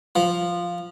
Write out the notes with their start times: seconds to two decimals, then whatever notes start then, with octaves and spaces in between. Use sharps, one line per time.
0.16 F3